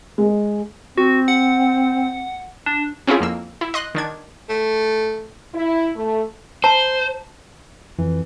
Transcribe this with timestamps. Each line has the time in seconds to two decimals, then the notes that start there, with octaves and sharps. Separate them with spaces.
0.18 G#3
0.98 C4 F#4
1.28 F#5
2.66 D4
3.07 C4 C#4 E4 F4 G#4
3.21 F2 A#3 E6
3.61 E4
3.74 D#5 C6 F#6
3.95 D#3 D4 G#6
4.49 A3
5.54 E4
5.95 A3
6.64 C5 A5 A#5
7.98 F2 E3